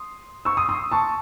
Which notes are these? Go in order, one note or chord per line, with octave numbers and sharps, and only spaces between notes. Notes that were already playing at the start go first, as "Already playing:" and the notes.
Already playing: C6 D#6
C#6 E6
C6 D#6
C6 D#6
A5 C#6